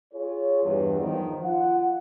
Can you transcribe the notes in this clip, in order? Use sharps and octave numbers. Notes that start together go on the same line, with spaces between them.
F4 G#4 C#5
E2 G2
D#3 F3
F4 F#5